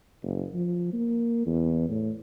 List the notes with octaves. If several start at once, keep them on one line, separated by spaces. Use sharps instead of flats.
F#1
F3
A#3
E2
A2